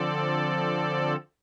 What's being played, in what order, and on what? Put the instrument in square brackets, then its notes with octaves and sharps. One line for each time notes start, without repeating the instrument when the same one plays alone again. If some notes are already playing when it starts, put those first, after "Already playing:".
Already playing: [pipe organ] D3 F3 C4 A4 D5